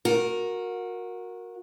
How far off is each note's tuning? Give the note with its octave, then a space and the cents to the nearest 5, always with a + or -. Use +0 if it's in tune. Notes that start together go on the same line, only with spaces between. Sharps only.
F#4 -25 A#4 +0